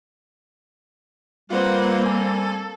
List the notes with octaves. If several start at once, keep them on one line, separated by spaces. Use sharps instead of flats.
G3 A#3 C4 F4 B4 C5 F#5
A4 G#5